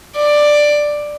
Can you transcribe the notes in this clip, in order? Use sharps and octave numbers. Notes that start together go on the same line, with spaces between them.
D5